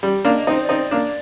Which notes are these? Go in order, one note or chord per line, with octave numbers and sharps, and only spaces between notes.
G3
A#3 D4
D#5
C4 D#4
C5
D5
C4 D#4
A#3 D4